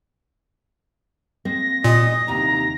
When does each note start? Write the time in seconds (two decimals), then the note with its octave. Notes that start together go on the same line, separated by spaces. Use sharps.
1.45 G#3 A#3 C4 A#6
1.84 A#2 D#5
2.28 D#2 C3 A#5